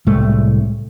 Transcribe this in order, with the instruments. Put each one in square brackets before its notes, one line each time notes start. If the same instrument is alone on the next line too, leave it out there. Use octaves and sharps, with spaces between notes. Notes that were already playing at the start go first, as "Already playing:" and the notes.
[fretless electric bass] C2 A2 G#3 A3